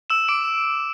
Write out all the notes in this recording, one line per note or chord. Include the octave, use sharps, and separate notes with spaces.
E6 E7
D6 D7